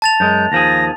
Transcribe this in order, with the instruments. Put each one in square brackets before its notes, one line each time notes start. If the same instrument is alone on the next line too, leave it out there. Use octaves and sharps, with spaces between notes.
[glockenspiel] A5 A6 F7
[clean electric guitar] F#2 G#3 [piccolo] G6
[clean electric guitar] D#2 F3 G#4 [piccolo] A#6